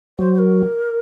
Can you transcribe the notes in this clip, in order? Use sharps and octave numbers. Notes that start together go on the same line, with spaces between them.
F#3 C5
C5
A#4